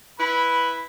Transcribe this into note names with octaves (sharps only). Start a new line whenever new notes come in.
E4 B4 B5